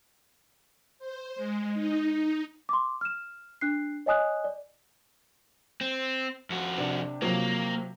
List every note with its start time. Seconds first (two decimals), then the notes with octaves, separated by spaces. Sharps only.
0.99 C5
1.36 G#3
1.73 D#4
2.08 D#4
2.69 C6 D6
3.01 F6 E7
3.61 D4 F#6 C7
4.06 C#5 D#5 G#5 D#6 F#6
4.44 D5
5.81 C4
6.50 F2 F#4
6.78 C3 D4
7.22 C3 F3 F#3 A#3